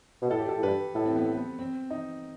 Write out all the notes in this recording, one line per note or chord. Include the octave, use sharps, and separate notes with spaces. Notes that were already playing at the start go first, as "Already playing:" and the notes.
B2
A2 A4
G4
A4
A2
G2 B4
A2 A4
C4
B3
B3
C4
D#4